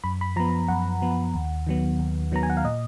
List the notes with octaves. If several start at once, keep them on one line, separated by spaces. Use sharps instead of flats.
F#2 B5
B5
F3 B3 A#5
F#2 F#5
F3 B3
D#2
D#3 F#3 B3
D#2
D#3 F#3 B3 A#5
G#5
F#5
F5
A#2 D#5